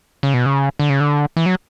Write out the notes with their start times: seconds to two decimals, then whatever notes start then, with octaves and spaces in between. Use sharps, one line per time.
0.23 C#3
0.34 B2
0.46 C#3
0.79 D3
0.90 C#3
1.00 D3
1.37 E3
1.46 F#3